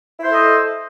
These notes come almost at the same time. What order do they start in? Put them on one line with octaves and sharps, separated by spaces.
E4 C5 A4 D#5